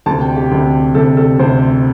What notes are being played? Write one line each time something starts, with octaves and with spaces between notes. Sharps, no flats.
D2 C3 A5
G5
G4
D2 C3
D2 C3 A4
A4
D2 C3 C5